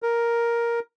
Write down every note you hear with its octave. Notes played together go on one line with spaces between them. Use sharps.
A#4